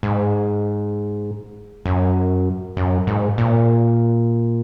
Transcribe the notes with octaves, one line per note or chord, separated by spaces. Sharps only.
G#2
F#2
F#2
G#2
A#2